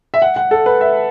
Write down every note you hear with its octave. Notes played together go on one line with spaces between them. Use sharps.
E5
F#5
F#5
A4
B4
E5